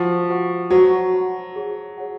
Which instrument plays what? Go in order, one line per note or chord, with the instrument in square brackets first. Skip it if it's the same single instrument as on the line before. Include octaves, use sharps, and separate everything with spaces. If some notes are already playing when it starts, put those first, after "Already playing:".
Already playing: [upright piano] F3 [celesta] F#4 C5 F#5 C#6
[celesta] F#4 C5 F#5 C#6
[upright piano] F#3 [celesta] F#4 C5 F#5 C#6
[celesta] F#4 C5 F#5 C#6
G#4 C#5 F#5
G#4 C#5 F#5